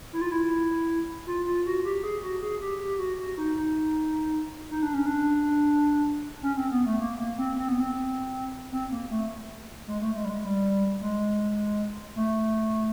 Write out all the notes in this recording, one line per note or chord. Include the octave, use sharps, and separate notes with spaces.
E4
F4
E4
F4
F4
F#4
G4
G#4
F#4
G#4
G4
G4
F#4
F#4
D#4
D#4
D#4
D4
C#4
D4
C#4
C4
B3
A3
A#3
A#3
C4
C4
B3
C4
C4
A#3
A3
G#3
A3
G#3
G3
G#3
G3
G#3
A3